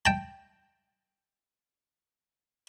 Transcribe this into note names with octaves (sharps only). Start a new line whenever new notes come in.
G5 A5